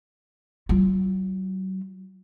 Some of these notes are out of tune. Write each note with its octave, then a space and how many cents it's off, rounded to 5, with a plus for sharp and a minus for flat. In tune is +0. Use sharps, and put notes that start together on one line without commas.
F#3 +40 F4 +0